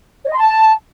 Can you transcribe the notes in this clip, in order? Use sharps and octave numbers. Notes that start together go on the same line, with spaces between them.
C#5
D#5
C6
A5